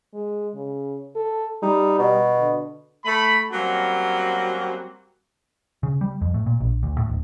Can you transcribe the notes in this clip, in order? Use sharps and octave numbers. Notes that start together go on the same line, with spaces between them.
G#3
C#3
A4
G3 D#4
B2
D3
A3 B5
F#3 G3 A#3 C4 C#4 F#4
C#3
G3
F2
A2
A#2
A#1
D2
A2
D1